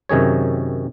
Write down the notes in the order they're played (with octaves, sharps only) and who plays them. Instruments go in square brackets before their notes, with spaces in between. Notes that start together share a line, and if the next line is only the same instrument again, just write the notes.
[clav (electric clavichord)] F#2 C3 D#3 G#4 C#5